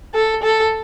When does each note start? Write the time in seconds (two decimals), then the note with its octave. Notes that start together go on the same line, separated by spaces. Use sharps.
0.14 A4
0.43 A4